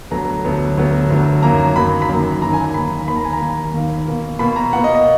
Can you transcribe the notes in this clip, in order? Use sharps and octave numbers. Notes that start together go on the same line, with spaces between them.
D2 D3 F#3 B3 A#5
D2 D3 F#3 B3
D2 D3 F#3 B3
D2 D3 F#3 B3
F#2 D#3 F#3 A#3 A#5
F#2 D#3 F#3 A#3 B5
B5
F#2 D#3 F#3 A#3
F#2 D#3 F#3 A#3 A#5
G#5
A#5
D#2 D#3 A#3 B5
D#2 D#3 A#3 B5
A#5
G#5
A#5
D#2 D#3 A#3
D#2 D#3 A#3
B2 A#3
B2 A#3 B5
A#5
B2 A#3 F#5
D#5
D#5